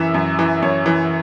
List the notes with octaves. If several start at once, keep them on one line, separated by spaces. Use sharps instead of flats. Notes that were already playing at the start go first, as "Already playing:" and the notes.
Already playing: F#2 E3 E5
F#2
E3
F#2 C#5
E3